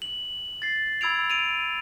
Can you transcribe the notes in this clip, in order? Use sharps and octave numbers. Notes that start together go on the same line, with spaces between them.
F#7
A6 C7
B5 E6 G#6 D7 F7
D7 D#7 F7